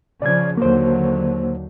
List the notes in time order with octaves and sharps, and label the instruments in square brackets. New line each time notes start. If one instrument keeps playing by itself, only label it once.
[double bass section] C#3 F3 [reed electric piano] D5 G#6
[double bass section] D#2 D3 F#3 [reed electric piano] A#3 C5